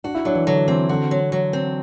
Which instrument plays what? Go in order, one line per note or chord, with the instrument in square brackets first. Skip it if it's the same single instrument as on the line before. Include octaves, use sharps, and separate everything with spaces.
[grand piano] D4 [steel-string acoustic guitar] F#4
[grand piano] E4
[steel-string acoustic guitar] F#3 [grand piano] D4
[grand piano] E3
[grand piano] D3 [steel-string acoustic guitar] F#3
[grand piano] E3 [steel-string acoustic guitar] C4
[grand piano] D3 [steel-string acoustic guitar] F#4
[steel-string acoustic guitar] F#3
F#3
C4